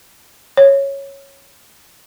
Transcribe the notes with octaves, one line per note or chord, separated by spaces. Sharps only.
C#5